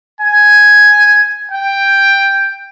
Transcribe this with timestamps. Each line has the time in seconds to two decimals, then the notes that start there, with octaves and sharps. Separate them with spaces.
0.21 G#5
1.52 G5